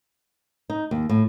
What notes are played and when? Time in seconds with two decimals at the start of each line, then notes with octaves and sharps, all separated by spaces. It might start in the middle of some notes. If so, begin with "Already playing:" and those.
0.70 D#4
0.91 D#2
1.09 A2